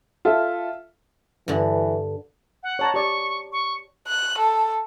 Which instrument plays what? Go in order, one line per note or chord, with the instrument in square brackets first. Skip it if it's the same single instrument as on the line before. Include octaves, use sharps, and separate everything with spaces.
[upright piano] F4 A4 E5
[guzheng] G2 D3 [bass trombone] E3
[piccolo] F#5
[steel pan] C#5 A5 A#5
[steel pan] G4 D5 [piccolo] C#6
[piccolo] C#6
[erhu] F#6
A4